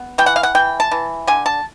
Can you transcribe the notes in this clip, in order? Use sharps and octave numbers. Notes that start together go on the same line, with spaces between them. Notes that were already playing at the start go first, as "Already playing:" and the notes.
Already playing: B3
E3 G5
F#5
F5
F#5
E3 G5
A5
E3
D3 G#5
A5